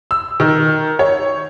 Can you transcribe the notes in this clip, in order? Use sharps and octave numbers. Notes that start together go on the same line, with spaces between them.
E6
D#3
C#5